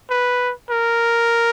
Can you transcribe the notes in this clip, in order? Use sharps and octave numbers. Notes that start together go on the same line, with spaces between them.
B4
A#4